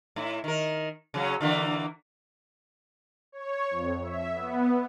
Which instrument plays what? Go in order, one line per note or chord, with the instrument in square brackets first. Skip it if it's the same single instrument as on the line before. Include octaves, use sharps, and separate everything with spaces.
[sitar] A2 E4
D#3 A#4
C#3 F#3 C#4
D3 E3 A#3
[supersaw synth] C#5
F2
E5
B3